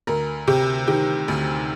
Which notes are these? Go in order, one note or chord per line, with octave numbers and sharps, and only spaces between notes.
D2 A#4
C3 G4
D#3 G4
D2